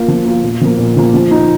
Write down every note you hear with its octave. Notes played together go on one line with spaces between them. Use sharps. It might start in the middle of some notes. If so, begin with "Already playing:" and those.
Already playing: A#3 F4
F3
A#3 F4
A#2
F3 A#3
A#2
F3 A#3
F3
D#4